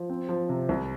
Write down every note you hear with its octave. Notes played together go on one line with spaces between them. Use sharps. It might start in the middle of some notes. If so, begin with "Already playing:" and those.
Already playing: F3
C4
F3
C3
C2